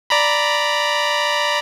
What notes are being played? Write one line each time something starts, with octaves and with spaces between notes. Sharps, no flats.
D5 A#5 B5